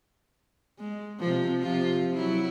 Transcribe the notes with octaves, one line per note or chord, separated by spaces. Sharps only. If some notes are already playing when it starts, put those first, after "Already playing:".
G#3
C3 F3
C3 F3 F4
F#3 E4